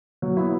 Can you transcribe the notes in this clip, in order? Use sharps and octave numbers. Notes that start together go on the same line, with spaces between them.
F#3
B3 E4